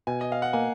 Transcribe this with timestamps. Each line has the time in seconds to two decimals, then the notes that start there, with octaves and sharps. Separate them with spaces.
0.07 B2 G#5
0.21 D#5
0.32 F5
0.42 F#5
0.53 A#3 G#5